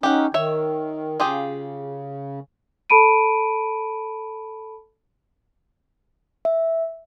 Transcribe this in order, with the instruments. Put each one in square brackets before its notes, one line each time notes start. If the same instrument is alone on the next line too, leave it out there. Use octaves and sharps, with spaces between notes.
[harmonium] C#4 D#4 [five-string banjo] G4 F#5
[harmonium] D#3 [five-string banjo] C#5 E5
[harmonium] C#3 [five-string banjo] F4 G4 G#4
[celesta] A4 A5 B5 D7 D#7
[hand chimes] E5